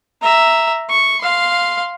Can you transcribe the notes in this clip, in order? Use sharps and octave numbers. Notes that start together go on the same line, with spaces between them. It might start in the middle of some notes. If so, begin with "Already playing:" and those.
E5 A#5
C#6
F5 C6